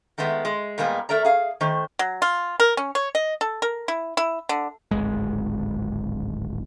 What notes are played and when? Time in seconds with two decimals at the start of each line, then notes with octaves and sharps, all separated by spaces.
0.18 D#3 G#3 A3 B3
0.45 G#3
0.78 A#2 G3 G#3 A#3 B3
1.09 A3 A#4 D5 A#5
1.25 G#4 F5
1.61 D#3 A3 C5
1.99 F#3
2.22 F4
2.60 A#4
2.77 C#4
2.95 C#5
3.15 D#5
3.41 A4
3.62 A#4
3.88 E4
4.17 E4
4.49 D3
4.91 D1 G#1 G#3